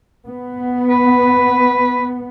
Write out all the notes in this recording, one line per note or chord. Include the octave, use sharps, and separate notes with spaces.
B3
B4